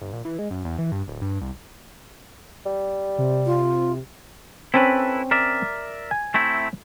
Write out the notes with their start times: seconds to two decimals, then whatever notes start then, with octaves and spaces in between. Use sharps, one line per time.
0.01 G1
0.13 A#1
0.25 E3
0.39 G#3
0.51 F#2
0.65 E2
0.79 E3
0.92 G2
1.08 D1
1.22 G2
1.41 C2
2.66 G3
3.18 C3
3.46 F4
4.74 C4 C#4 E4 A4 B4
5.31 A#4 D5 E5
6.11 G#5
6.34 A3 C4 E4